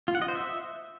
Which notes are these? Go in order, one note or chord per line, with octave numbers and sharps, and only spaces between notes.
F4
F#5
D#5
C5
E5